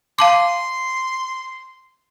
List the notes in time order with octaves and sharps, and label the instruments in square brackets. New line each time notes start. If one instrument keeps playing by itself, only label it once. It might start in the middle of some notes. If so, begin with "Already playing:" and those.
[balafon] F5 A5 D6 [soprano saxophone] C6